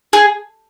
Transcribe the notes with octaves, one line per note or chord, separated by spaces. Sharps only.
G#4